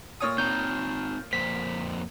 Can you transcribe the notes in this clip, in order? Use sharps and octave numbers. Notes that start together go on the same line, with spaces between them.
A#2 C#5 D#6
C4 D#4 A#5 G6
F2 A#3 C5 B6